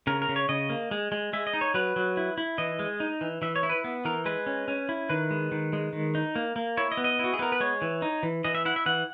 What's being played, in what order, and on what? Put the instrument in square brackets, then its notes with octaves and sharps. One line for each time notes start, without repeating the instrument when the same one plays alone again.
[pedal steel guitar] C#3 A#4
A#4
C#3
C#5
C#3 D#5
A#3
G#3
G#3
G#3 E5
D#5
D#4
C#5
F#3 B4
F#3
E4
E4
E3 D#5
G#3
D#4
E3
E3 E5
C#5
E4
B4
B3
E3 A#4
G#3 B4
C#4
C#4
E4
D#3 B4
G#3
D#3
G#3
D#3
D#4
A#3
A#3
E4 C#5
D#5
B3
D#5
E4 F#4
G#4
B3 A#4
B4
G#3 C#5
E3
D#4
E3
E3 D#5
E5
E4 F#5
E5
E3 F#5